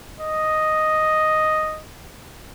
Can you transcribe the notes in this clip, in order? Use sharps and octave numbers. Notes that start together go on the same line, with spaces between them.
D#5